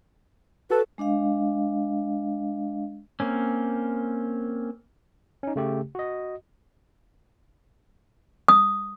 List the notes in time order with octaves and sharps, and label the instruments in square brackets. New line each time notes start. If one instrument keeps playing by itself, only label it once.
[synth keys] F#4 A4 [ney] B4
[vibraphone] G#3 D4 D#5 F5
[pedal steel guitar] A#3 C4 C#4
[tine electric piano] C#4 D#4
C#3 A3 G4
F#4 D#5
[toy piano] D#6